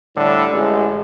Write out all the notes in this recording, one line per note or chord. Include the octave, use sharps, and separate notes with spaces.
A2 D3 G3
A1 G#3